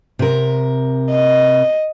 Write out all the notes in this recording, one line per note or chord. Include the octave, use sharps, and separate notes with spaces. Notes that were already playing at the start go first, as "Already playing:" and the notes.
C3 A#4
D#5